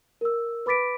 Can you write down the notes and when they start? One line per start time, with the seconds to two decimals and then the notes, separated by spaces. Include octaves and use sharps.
0.21 A#4 E6
0.66 B4 B5 D6 A6 B6 D7